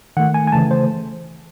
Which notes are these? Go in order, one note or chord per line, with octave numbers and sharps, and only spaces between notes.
D#3 A3 F#5
G#5
G#5
C#3 E3 A3 A5
C5